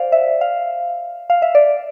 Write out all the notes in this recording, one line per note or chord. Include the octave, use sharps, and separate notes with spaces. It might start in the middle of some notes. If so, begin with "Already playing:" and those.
Already playing: C5 D5 F5
E5
F5
F5
E5
D5